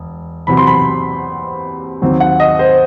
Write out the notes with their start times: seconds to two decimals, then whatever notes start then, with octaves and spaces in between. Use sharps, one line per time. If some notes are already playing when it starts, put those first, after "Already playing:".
Already playing: E1
0.47 E2 C3 F#3 B5
0.57 C6
0.67 B5
2.02 D#2 D#3 F#3 C4
2.20 F#5
2.40 D#5
2.59 C5